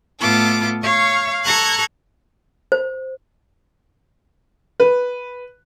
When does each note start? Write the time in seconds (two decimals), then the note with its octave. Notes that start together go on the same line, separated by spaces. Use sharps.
0.21 A2 B3 F4 A4 D6
0.82 C#5 F5 C#6
1.43 A4 A#5 C#6 F#6 G#6
2.72 C5
4.80 B4